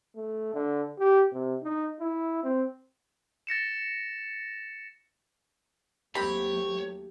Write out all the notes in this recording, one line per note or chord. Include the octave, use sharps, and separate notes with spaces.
A3
D3
G4
C3
D#4
E4
C4
A6 A#6 C#7 E7
D#2 F#3 A3 C4 G4 C#5 B5